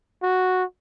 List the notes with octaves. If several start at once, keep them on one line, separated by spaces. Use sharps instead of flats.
F#4